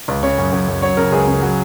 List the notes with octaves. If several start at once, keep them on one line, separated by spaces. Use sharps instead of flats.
C#2
C#3 C#5
F#2
F#2
F#2
F#3 C#5
C#3 A#4
C#2 G#4
C#3
F#3